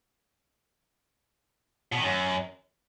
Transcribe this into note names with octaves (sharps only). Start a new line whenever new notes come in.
B2
D#3
F#2